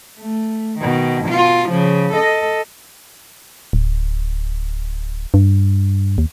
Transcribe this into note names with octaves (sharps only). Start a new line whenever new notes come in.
A3
B2 D#3
B2 F4
C#3 F3
A4 D#5
D1
G2
D#2